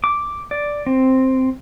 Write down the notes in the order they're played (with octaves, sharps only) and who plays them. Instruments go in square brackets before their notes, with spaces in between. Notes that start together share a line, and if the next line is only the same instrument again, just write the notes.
[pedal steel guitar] D6
D5
C4